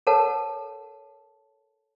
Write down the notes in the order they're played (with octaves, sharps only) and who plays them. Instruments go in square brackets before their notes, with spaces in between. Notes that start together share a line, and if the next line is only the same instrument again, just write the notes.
[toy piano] A4 A#4 C#5 F#5 A5